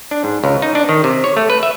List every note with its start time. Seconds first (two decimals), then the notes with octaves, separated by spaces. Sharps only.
0.11 D4
0.24 G#2
0.44 C#2
0.62 D#4
0.75 D4
0.89 D#3
1.04 C3
1.24 C#5
1.37 A3
1.50 B4
1.63 E5